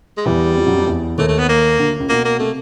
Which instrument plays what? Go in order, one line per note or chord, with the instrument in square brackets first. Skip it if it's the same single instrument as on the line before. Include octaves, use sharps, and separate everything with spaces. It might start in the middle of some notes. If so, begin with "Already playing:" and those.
[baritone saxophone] G#3
[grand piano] E2 E3 [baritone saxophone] G3
[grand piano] F2 F3
F#2 F#3
F2 F3
E2 E3
[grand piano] D#2 D#3 [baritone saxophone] A3
[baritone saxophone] A3
B3
A#3
[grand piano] D2 D3
C#2 C#3
[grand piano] B2 [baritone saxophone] A#3
[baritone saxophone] A#3
[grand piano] C3 [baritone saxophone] A3